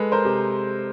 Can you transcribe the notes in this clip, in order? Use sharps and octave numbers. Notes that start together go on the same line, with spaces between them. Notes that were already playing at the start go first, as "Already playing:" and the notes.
Already playing: G#3 A4 B4
A#4 C5
C3